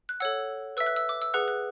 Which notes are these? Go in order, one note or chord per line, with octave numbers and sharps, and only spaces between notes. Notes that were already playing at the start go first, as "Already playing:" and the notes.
F#6
A4 C#5 F#5 E6
B4 E5 E6
F#6
E6
D6
E6
G#4 B4 F#5 F#6
F#6